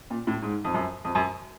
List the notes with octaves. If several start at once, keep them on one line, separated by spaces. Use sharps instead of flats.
A#2
A2
G#2
F2
F#2
F2
F#2